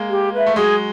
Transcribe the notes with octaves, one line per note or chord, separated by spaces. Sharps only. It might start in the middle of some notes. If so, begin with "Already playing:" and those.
Already playing: G#3 A#3
G4
B4 E5
A3
F#3 G#3 G#4